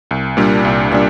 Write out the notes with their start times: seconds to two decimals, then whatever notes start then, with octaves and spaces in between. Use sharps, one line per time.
0.11 C2
0.37 A#2 G3 D4
0.65 C2
0.92 A#2 G3 D4